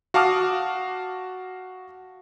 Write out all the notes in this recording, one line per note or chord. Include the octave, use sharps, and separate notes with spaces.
F#4 F5 A5 D6 D#6 F6